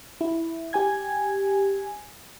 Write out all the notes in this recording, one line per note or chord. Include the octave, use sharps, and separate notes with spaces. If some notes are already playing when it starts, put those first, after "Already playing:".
E4
G4 G#5 G#6